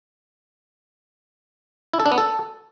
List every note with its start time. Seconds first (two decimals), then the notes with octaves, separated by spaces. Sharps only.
1.93 E4
2.00 A4
2.06 D4
2.12 B3
2.18 A4